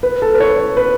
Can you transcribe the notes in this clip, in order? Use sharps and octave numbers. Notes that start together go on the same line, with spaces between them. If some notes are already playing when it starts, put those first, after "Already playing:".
B4
A4
B4
C#5
C#5
B4